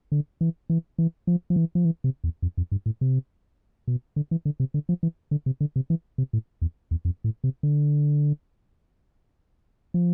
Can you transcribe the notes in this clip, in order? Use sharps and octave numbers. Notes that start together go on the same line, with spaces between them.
D3
E3
E3
E3
F3
F3
E3
F3
E3
C3
E2
F2
F2
G2
A2
C3
B2
D3
E3
D3
C3
D3
F3
E3
D3
C3
D3
C3
E3
C3
A2
E2
E2
F2
A2
C3
D3
F3